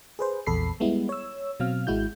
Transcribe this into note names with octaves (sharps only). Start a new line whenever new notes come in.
G#4 B4 C5
A#1 E2 A4 B5 C7
G3 G#3 B3 E4
C#5 E6
B2 F#3 C4 F5 F6
G#1 G#3 E4 F#4 G6